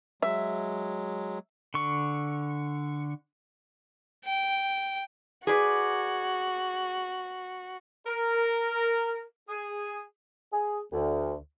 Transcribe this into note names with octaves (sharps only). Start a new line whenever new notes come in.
F#3 G#3 E5
D3 C#6
G5
F#4 G#4 B4 D5
A#4
G#4
G#4
D2